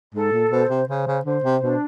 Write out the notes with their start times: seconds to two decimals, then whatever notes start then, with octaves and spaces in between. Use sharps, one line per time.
0.15 G#2 A4
0.32 A#2
0.51 B2 C5
0.69 C3
0.88 C#3 C5
1.07 C#3
1.25 D3 C5
1.44 C3
1.63 B2 D4